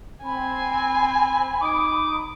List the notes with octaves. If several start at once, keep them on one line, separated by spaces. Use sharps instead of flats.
C4 G#5 B5
D#4 D6 D#6